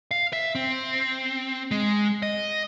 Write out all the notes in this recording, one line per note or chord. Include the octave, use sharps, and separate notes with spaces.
F5
E5
C4
G#3
D#5